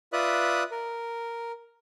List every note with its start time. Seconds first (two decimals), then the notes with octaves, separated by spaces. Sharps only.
0.13 F4 B4 D5 E5 D#6 F#6
0.71 A#4